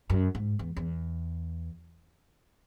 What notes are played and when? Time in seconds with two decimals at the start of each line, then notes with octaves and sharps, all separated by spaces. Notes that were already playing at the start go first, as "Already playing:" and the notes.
0.10 F#2
0.35 G#2
0.59 E2
0.76 E2